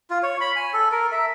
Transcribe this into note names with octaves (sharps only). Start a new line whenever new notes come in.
F4
C#5
B5
G#5
A4
A#4
E5